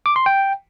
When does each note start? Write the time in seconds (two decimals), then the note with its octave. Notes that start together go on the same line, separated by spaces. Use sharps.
0.06 D6
0.16 C6
0.26 G5